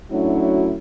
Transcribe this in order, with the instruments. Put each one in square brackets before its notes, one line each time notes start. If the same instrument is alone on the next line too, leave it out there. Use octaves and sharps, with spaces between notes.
[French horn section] F#3 A3 C#4 D4 E4 F#4